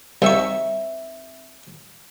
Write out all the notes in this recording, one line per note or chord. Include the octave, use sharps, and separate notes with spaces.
C2 C4 D#4 E5 C#6